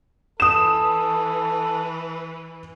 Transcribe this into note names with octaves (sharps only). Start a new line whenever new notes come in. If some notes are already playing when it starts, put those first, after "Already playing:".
E3 A4 B4 D#6 E7